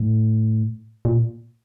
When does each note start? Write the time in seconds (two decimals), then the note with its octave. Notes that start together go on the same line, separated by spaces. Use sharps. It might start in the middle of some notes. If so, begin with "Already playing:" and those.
Already playing: A2
1.05 A#2